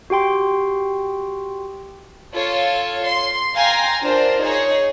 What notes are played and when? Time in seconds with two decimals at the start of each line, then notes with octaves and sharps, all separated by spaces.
0.10 F#4 G4 G5 C6
2.34 F4 A4 C#5
3.07 C6
3.56 F5 G5 G#5 A#5 C6
4.02 D4 F4 A#4 C5
4.42 D#4 G#4 C#5